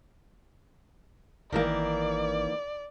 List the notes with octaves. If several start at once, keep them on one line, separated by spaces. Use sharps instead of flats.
G#1 D#3 E3 A#3 D5